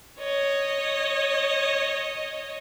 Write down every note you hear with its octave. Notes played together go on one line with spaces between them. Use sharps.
C#5 D#5